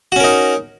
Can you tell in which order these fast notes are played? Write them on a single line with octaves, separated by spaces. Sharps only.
F#4 C#4 A#4 D#4